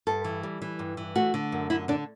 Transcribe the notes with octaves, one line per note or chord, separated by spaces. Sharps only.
G2 A4
E3
G3
E3
G2
E3
A3 F#4
D3
F#2
D3 E4
D3 D4